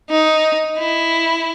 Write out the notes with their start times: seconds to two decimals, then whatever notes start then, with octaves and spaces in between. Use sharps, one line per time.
0.10 D#4
0.79 E4